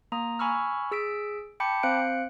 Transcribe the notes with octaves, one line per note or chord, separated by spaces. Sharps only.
A#3 A#5 D#6
G#5 B5 C#6 E6 F6
G#4 E6 B6 D7
G5 A5 B5 D6 G6 C#7
C4 C5 F5 F#6 C#7 D7